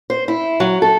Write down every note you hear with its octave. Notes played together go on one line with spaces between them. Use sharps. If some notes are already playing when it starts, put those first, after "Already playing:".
C5
E4
F#3
A4